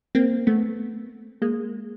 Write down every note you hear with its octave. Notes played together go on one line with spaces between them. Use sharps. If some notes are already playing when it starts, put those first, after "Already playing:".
A#3 C4
A3 B3
G#3 A#3